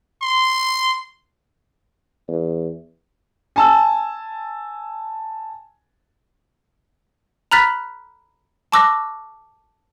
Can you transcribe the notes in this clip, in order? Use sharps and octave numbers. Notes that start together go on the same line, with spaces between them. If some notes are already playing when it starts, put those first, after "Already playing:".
C6
E2
G#5 A5 E6
A#5 B5 F6 F#6 A6 B6
A5 C#6 D6 E6 F#6 A#6